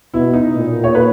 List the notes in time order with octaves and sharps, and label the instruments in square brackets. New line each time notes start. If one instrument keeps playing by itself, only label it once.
[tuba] B2 [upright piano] E4
[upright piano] D#4
[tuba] A#2
[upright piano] C#5
B4